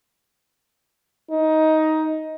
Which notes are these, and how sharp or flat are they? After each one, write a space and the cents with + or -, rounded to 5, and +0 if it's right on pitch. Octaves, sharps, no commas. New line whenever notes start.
D#4 +15